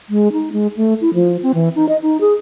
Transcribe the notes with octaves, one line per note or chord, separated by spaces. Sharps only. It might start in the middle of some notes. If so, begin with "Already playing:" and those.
G#3
D#4
G#3
A3
E4
F3
C4
E3
D#4
D#5
D#4
G#4